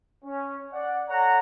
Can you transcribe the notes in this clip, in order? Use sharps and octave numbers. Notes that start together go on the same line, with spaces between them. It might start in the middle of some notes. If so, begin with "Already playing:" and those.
C#4
D5 F#5
A4 C#5 F#5 A#5